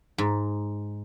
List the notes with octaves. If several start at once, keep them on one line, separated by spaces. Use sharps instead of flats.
G#2